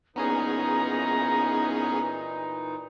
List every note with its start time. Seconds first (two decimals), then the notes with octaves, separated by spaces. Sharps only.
0.16 A#2 E3 B3 C#4 D#4 G#4 A#5